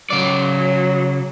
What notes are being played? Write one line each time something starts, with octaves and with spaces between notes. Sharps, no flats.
C#3 F#3 D5